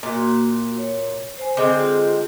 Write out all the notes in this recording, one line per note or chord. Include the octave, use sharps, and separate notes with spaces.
A#2 A#3 F#4
C#5
C5 G#5
D3 G#3 C4
F4